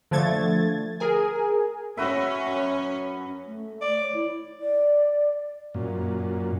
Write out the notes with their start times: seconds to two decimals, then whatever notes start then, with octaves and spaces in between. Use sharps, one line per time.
0.11 D3 F3 A3 G#6 A6
1.00 G#4 A#4 G#5
1.97 C#4 F#4 B4 E5
2.47 F#2
3.47 A3
3.82 D5
3.99 C#5
4.14 E4
4.61 D5
5.74 F#2 A#2